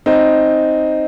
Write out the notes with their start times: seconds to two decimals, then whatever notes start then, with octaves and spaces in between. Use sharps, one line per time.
0.06 C4 D#4